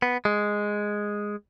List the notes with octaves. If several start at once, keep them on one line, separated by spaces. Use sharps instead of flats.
B3
G#3